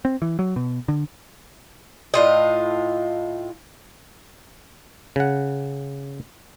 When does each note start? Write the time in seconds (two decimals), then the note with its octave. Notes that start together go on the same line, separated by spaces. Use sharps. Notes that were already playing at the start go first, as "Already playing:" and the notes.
0.05 C4
0.22 E3
0.39 F#3
0.56 B2
0.88 D3
2.14 A2 F4 D#5
5.16 C#3 F#5